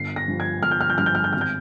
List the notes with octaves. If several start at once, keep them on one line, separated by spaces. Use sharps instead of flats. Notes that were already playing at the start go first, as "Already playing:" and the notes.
Already playing: G1 C7
A#6
G2 F3
G#6
G1 F6
G6
F6
G6
G2 F3 F6
G6
F6
G6
G#1 F6
G6